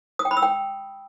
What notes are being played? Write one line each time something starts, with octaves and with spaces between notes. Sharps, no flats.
D#6
G5
B5
E6
G5